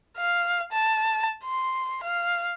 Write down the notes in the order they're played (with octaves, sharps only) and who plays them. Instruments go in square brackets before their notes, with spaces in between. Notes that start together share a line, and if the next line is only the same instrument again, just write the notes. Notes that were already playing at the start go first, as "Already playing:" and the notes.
[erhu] F5
A5
C6
F5